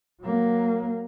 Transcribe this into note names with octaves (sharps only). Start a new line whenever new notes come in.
F#3 A#3